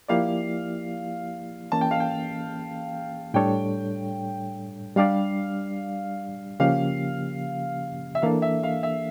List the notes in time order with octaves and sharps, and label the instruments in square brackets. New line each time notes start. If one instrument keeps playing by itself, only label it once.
[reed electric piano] F3 A#3 E4 G4 D5 [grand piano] F5
[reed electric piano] E3 A#3 C#4 [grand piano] A5
[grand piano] G5
F5
G5
[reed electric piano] A2 G3 D4 A4 C#5 [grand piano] G5
[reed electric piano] G3 D4 G4 D5 [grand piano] F5
[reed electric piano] C#3 F3 A#3 C#4 G4 [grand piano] F5
[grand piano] E5
[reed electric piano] E3 A#3 D4 A4 [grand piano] F5
[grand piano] E5
F5
E5